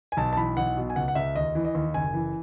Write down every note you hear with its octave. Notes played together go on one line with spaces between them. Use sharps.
G#5
B1 A5
A5
E3 B5
B1 F#5
B2
G#5
C#2 F#5
F#5
C#2 E5
D#2 D#5
E3
D#5
D#2
F#1 G#5
E3